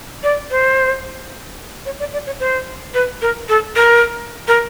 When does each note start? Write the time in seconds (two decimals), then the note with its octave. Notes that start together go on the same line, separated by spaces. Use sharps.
0.23 D5
0.51 C5
1.86 C#5
2.00 D5
2.13 D5
2.26 C#5
2.40 C5
2.94 B4
3.22 A#4
3.49 A4
3.76 A#4
4.48 A#4